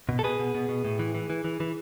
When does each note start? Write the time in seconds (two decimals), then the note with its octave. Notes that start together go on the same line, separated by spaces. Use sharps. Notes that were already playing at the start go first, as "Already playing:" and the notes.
0.09 B2
0.19 A4
0.23 B2 G#4 B4
0.40 B2
0.55 B2
0.69 B2
0.84 A2
0.99 E3
1.15 E3
1.30 E3
1.45 E3
1.60 E3